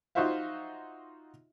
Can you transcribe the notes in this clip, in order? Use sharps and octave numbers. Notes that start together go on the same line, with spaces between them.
D#4 F4 F#4 C5 E5 F5